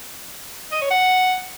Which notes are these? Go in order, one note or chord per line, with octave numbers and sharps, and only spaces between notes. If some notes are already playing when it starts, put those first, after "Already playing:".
D#5
C#5
F#5